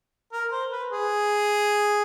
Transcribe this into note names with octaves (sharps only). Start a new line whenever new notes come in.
A#4
C5
B4
G#4